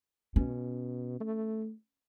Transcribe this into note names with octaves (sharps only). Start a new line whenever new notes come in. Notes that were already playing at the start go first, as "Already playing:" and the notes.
B2 C#4
A3